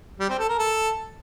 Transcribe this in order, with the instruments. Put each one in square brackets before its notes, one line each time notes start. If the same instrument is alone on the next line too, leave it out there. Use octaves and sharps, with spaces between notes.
[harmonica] G3
C4
A4
A#4
A4